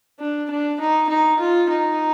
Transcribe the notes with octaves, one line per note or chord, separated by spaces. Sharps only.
D4
D4
D#4
D#4
F4
D#4